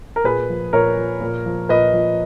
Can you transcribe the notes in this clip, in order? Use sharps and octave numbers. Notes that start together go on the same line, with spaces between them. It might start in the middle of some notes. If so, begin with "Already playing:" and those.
A#4
A#2 G#4 B4
F3
A#2 A#4 C#5
F3
A#2
F3
A#2 B4 D#5
F3